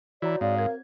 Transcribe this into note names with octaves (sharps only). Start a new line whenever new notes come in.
E3 F#4 C#5 D5 A#5
G#2 C4 D5 F5
A#4 G#6